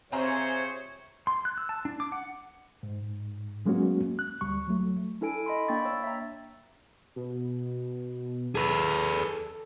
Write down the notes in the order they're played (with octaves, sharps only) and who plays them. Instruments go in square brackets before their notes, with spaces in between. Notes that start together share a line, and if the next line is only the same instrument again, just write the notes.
[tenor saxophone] C3 [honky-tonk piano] C4 G#5 A#5 [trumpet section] F4 G#4 C5 [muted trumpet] C#5
[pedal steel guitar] C6
F#6
E6
A5
D4
D6
F#5
[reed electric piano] G#2
F#3 G#3 A#3 B3 C#4 F#4
F#6
D2 G3 C#6
F#3 A3
[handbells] D4 E4 A4 G#5 D7
D#5 B5 C6
A#3 D4 G5 B5 C#6 A6
C#5 E6 A6
E5 A#5
[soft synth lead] B2
[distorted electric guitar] G#4 B4 [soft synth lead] A4